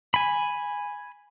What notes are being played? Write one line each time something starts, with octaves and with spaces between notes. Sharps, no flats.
G#5 B5